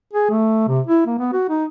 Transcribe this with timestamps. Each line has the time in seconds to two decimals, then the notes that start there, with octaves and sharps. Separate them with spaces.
0.13 G#4
0.30 A3
0.68 C3
0.87 E4
1.07 A#3
1.19 B3
1.32 F#4
1.49 D#4